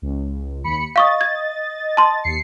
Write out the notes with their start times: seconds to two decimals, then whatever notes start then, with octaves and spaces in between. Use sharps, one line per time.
0.02 C#2
0.64 D#2 B5 C#7
0.96 D#5 F5 C#6 D#6 A6
1.21 G#6
1.97 A5 C6
2.24 D#2 C7 C#7